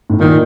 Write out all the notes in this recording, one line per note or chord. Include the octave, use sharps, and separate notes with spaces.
A2
A#2 D#3